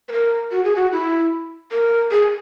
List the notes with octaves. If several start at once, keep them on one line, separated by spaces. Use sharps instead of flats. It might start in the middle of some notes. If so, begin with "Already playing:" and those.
B4
A#4
F#4
G#4
F#4
E4
A#4
G#4